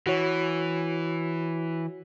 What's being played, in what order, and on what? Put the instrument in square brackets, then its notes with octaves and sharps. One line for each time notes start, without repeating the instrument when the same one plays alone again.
[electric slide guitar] E3 [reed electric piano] F#4 C#5